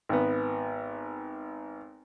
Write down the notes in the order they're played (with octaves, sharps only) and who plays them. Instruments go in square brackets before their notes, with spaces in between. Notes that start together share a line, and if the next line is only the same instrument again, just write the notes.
[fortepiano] G#1 B3